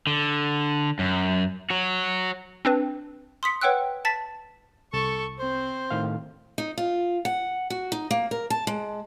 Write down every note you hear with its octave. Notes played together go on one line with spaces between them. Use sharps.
D3
F#2
F#4 C#5
C4 D4 B4
C6 D#6 B6 C#7
B4 C#5 F#5 G5 E6 F#6
A5 A6 B6
C2 A4 C#6
C4 C5
A2 D#3 F5
D#4
F4
F#5
F#4
D#4
A#3
A#4
A5
G#3